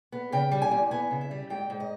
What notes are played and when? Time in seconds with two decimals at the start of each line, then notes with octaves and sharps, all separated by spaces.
0.12 B3
0.32 C#3 G5
0.51 G3
0.62 G#5
0.71 E2
0.91 B3 G#5
1.11 C#3
1.21 E5
1.31 G3
1.50 G#2 G5
1.70 G#2
1.80 D#5